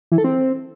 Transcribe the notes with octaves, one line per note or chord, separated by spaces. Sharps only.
E3
A4
C4